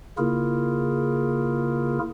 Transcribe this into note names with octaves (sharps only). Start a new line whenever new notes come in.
C#3 A#3 E4 F4 G#4 A#4